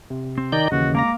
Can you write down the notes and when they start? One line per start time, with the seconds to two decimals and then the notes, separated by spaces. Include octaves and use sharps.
0.10 C3
0.38 C4
0.52 D#3 D5 D#5 A#5 G6
0.72 D#2 C#3 E3 F#4
0.95 G#3 A#3 F5 A#5 D6 A#6